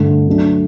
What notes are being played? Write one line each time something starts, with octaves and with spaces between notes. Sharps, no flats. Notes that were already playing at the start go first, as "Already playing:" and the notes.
Already playing: G2 D3 A3 D4
D3 F#3 A3 D4